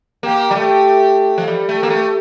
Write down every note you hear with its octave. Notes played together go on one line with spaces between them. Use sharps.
A#3 G4
G3
A3 G4
F3
G3 G4
A3
A#3
A3